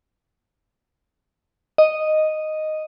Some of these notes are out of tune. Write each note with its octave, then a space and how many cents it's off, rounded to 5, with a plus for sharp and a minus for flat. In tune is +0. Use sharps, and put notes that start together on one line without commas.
D#5 -5